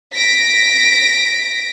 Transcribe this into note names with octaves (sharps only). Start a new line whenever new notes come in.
A#6 B6 D7